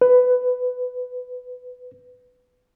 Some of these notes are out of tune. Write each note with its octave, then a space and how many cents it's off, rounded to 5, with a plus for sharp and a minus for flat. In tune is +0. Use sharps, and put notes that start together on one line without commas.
B4 +15